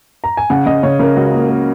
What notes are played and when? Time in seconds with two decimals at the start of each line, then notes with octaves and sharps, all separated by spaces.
0.24 A#5
0.37 G#5
0.50 C#3 F#5
0.66 C#3 D#5
0.83 C#3 C#5
0.99 C#3 A#4
1.16 C#2 F#4
1.33 A#3
1.49 A#3